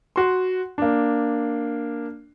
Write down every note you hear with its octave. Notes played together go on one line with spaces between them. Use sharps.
F#4 C6
A#3 D4